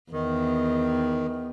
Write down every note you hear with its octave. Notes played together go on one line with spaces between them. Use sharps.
E2 D#3